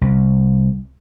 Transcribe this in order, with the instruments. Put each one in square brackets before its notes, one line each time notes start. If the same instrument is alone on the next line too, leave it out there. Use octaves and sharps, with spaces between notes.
[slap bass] C2